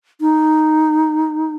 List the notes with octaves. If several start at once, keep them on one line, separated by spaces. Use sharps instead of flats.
D#4